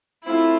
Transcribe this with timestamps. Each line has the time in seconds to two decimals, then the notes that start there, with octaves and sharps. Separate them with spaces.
0.24 A3 C4 E4 F4